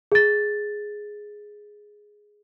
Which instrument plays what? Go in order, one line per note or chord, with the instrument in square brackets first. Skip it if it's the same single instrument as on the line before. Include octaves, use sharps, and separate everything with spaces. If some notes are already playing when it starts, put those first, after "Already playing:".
[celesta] G#4 A6